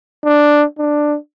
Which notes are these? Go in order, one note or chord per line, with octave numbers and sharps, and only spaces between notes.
D4
D4